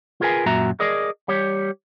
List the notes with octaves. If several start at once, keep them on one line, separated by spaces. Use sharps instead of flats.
F4 G#4 A#4 B4 G#5
F#2 A#2 F#4 E5 A#5
G#4 A#4 D5 D#5
G3 G4 C#5